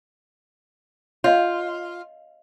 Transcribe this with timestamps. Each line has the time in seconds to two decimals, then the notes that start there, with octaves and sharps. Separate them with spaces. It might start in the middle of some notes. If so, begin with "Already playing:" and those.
1.24 F4 C#5 D#5 F5